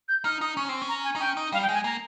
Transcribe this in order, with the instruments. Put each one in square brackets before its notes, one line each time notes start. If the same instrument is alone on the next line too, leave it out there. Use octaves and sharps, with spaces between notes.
[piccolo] G6
[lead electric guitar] D#4 [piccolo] F6
[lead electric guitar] D#4 [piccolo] D#6
[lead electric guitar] C#4 [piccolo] C#6
[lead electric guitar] C4 [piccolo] C6
[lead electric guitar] C#4
[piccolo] A#5
G#5
[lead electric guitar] D#4
[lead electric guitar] C#4 [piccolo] G5
[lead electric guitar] D#4
[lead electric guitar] G3 [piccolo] F5
[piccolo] G5
[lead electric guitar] G#3
[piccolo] G#5
[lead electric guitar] A#3 [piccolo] A#5